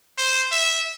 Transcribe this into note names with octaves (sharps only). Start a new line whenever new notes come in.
C5
E5